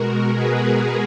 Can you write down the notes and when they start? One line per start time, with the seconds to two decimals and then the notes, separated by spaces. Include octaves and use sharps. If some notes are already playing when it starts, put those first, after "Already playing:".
Already playing: B2 G#3 F#4 A#4
0.33 G#4 B4